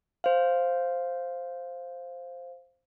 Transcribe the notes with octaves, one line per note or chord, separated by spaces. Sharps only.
C5 F5